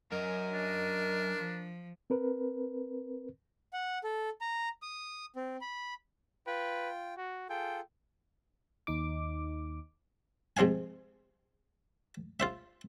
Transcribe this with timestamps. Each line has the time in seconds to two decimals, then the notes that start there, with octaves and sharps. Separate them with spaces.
0.12 F#2 F#3 A#4 D#5
0.53 D4
1.35 F3
2.10 C4 A#4 B4
3.73 F#5
4.04 A4
4.41 A#5
4.82 D#6
5.36 C4
5.61 B5
6.47 F4 B4 G5
7.17 F#4
7.49 F4 G#4 A4 G5
8.87 D#2 D#4 D6
10.57 G#2 C3 F3 F5 G#5
12.40 F4 C5 E5